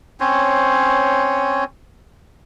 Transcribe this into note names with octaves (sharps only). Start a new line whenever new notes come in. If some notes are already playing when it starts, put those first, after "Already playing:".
C4 C#4 C5 C#5